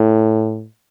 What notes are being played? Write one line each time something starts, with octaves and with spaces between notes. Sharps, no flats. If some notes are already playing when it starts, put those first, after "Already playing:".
Already playing: A2